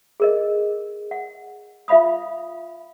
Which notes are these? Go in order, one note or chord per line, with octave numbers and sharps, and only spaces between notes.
G#4 A#4 D#5
F#5
F4 E5 F5 B5 D#6